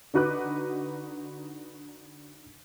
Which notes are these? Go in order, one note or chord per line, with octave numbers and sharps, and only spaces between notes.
D3 D#4 F#4 B4 D6 F#6